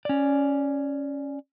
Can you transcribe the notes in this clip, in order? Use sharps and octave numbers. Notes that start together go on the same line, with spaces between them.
C#4 D5